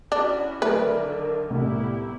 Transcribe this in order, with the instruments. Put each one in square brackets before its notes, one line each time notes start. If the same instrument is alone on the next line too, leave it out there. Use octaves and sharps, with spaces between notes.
[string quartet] C#4 E4 F#4 [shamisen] D4 [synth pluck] D5
[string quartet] D3 D#3 F#3 [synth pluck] A3 [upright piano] A#4 D5 E5 [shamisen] B4
[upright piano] C2 A2 G3 [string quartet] B3 E4 G4